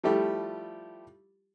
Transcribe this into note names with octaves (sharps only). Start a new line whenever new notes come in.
F3 G3 A3 E4 F4 G4